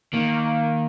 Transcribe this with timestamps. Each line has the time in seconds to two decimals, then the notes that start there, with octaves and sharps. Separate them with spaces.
0.13 D#3 A#3